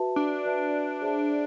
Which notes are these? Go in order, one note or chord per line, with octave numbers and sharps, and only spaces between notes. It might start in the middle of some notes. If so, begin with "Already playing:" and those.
Already playing: F#4 B4 E5 A5
D4
F#4 B4 E5 A5
G#4 C5 E5 A5